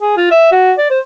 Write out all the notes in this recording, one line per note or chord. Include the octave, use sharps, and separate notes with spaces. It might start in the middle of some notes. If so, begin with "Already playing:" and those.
G#4
F4
E5
F#4
D5
C5